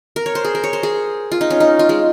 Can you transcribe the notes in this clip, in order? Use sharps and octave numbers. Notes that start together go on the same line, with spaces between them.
A#4
C#5
C5
G#4
A#4
C#5
C5
G#4
F4
D#4
C#4
D#4
F4
G#3